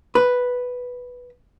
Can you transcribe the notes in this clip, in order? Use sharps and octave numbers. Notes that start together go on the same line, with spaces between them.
B4